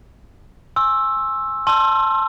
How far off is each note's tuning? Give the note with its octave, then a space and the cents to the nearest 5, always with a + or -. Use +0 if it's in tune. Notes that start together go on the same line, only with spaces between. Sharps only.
G#5 +0 C6 +35 E6 +0
A5 +0 C6 +25 E6 +35